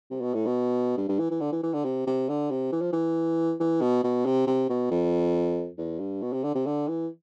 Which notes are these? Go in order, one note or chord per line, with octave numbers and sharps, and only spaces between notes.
C3
B2
A2
B2
G2
G2
E3
E3
D3
E3
E3
D3
C3
C3
D3
C3
E3
F3
E3
E3
B2
B2
C3
C3
B2
F2
E2
G2
B2
C3
D3
C3
D3
E3